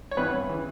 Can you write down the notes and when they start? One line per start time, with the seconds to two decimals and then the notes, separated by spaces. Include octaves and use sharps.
0.11 C#5
0.17 G2 E3 B3 B4
0.49 C#3 E3